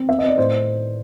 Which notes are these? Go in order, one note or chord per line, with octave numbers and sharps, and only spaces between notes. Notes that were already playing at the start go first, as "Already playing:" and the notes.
Already playing: C4
B3 E5
D#5
B3 D5
A2 C5